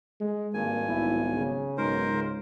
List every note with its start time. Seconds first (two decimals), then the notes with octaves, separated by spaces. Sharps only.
0.20 G#3
0.54 G#1 G2 A#3 G#5
0.88 B1 E4
1.37 C#3
1.78 B1 G#2 A#4 C5
2.09 C#2